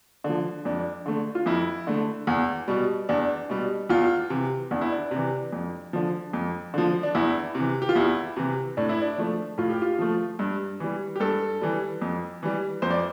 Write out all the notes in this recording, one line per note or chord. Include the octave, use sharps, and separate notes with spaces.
D3 F3
F2 D4
D3 A3
F4
F2 E4
D3 A3
E2
B2 G3
E2 D4
B2 G3
E2 F4
C3 E3
E2 D4
E4
D4
C3
E3
F2
D3 F3
F2
D3 F3
D4
E2 E4
C3 E3
G4
F4
E2 E4
C3 E3
A2 D4
E4
D4
F3 A3
A2 F4
G4
F4
F3 A3
G2
E3 G3
G4
G2 A4
E3 G3
F2
E3 G3
F2 C5
D5